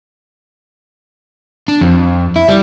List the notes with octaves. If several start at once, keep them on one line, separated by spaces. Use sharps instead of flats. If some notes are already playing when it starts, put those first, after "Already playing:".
D4
F2
E4
G3